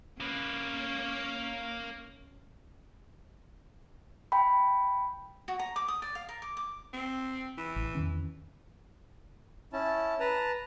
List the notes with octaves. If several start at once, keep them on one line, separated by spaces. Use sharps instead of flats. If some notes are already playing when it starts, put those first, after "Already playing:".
A#3 C#4 B4
G5 B5
F#4
A#5
D6
D#6
D5
F5
A#4
D6
D6
C4
E3
A1
E2 D#3 C#4
C#4 E4 A5
B4 A5 A#5